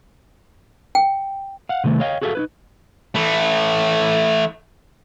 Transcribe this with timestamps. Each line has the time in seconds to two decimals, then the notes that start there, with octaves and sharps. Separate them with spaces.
0.95 G5
1.69 F5 F#5
1.84 C3 D#3 A3
2.00 C#5 D#5 F5 G5
2.22 F#4 G#4 A4 C5 E5 F5
2.35 D#4 E4 B4
3.15 E3 A3